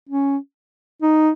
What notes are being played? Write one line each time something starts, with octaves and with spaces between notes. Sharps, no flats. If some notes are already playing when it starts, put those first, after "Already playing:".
C#4
D#4